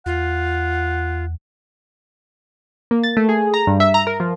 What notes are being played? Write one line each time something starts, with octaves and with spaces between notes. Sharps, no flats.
E2 F4 F#5
A#3
A6
A3
G#4
A#5
G2
E5
A#5
A#4
F3